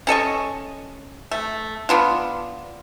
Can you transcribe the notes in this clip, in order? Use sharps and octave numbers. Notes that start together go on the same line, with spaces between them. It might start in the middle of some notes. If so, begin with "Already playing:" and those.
C#4 A4 D#5 C#6
A3
B3 D4 F4